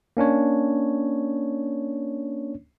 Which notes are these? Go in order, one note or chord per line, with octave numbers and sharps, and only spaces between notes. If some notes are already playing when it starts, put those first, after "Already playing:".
A#3 C#4 D4 C#5